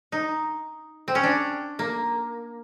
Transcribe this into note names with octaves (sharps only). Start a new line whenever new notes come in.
D#4
C4
C#4
D4
A#3